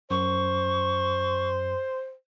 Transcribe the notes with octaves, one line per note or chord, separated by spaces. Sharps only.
F#2 C5 C#6